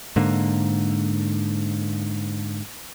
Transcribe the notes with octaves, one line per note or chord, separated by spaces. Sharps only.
G#2 D3 A#3